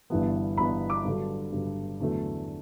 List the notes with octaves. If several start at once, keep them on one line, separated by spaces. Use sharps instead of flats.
G1 G2 E3 B3
G1 G2 E3 B3 B5
D6
G2 D3 F#3
G2 D3 F#3
E2 D3 F#3 A3